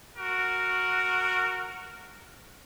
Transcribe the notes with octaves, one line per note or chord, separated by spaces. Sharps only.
F#4 A#4